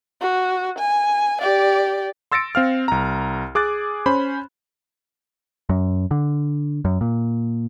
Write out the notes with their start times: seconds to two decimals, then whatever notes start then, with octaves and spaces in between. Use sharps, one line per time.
0.21 F#4
0.78 G#5
1.41 G4 D5
2.32 C6 E6 A6 A#6 C#7 D7
2.55 C4 F5 F6
2.88 C2 A#5
3.55 G#4 D6 F#6 A6
4.06 C#4 C5 B5
5.69 F#2
6.11 D3
6.85 F#2
7.01 A#2